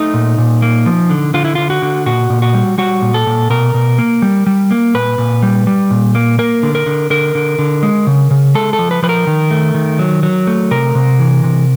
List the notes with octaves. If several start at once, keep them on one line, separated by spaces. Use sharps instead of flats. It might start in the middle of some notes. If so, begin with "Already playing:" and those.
Already playing: A3 D#4
A#2
A#2
A#3
F3
D3
D3 F4
E4
D3 F4
F#4
D3
A#2 F#4
A#2
F#4
G3
G3 F#4
A#2
A4
A#2
B2 A#4
B2
A#3
G3
G3
A#3
A#2 B4
A#2
G3
G3
A#2
A#3
A#3 A#4
D3
A#4
D3
D3 A#4
D3
D3
G#3
C#3
C#3
G#3 A4
A4
F3
B4
F3 B4
A#4
D#3
A3
D#3
F#3
F#3
A3
C3 A#4
C3
E3
C3